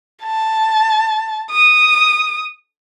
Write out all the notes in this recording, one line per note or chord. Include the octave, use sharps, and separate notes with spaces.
A5
D#6